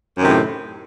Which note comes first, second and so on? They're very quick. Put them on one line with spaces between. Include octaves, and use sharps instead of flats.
F#2 D#3 C3 A2